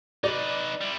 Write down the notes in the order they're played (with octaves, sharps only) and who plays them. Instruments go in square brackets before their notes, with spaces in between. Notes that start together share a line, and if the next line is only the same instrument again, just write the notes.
[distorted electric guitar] D#4 B4 [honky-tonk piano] D5
[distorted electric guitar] G3 E4